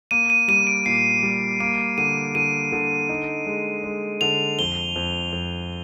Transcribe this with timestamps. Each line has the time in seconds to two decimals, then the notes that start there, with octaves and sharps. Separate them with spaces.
0.11 A#3 D#7
0.30 D#7
0.48 G3 D#7
0.67 D7
0.86 A#2 C7
1.23 G3
1.60 A#3 D7
1.98 D3 D#7
2.35 D3 D#7
2.72 D3
3.09 D#4
3.46 G#3
3.84 G#3
4.21 D3 F7
4.59 F2 G7
4.96 F2
5.32 F2